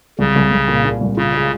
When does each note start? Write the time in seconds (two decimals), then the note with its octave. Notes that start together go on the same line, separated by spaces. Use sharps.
0.19 C2 C#3
0.36 C2
0.51 C2
0.68 A#2
0.85 A#2
1.01 C2
1.17 C#3 F4
1.34 G#3